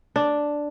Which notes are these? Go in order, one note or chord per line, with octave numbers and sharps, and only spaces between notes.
D4